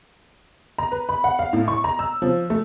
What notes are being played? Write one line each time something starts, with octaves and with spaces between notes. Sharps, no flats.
A#5
B4
B5
F#5
F5
A2
C#6
A#5
E6
F3
A3